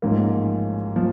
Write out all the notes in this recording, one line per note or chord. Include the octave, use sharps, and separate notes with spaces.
A1 G#2 F3 A#3
F3